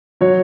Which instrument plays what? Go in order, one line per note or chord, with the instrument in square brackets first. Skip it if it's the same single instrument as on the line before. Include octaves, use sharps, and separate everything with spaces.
[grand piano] F#3 C#5